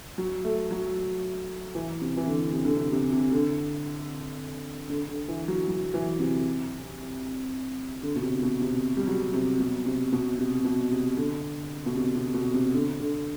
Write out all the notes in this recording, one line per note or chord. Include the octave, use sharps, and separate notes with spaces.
F#3
A3
F#3
E3
C3
E3
D3
C3
D3
C3
C3
C3
D3
D3
D3
E3
F#3
F#3
E3
C3
D3
B2
C3
B2
C3
G3
F#3
C3
B2
C3
B2
C3
B2
C3
D3
B2
C3
C3
B2
C3
D3
D3